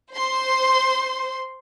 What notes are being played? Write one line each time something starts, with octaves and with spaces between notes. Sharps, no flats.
C5 C6